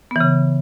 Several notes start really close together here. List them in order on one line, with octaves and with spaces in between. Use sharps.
B3 E3 C#3